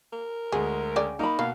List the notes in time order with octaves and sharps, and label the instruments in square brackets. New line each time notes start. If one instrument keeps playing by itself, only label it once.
[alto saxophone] A#4
[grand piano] D2 G#3 [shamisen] G#4
[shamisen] C#3 G#4 D5 [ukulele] G5
[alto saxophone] A#3 [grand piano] D#4 [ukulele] A#5 B5
[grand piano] B2 [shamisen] A#3 [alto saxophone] F5